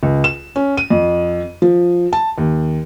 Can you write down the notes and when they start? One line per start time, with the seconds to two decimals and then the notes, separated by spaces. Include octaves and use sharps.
0.03 C#2
0.24 E7
0.56 C#4
0.77 D#7
0.90 F2
1.62 F3
2.13 A5
2.38 D#2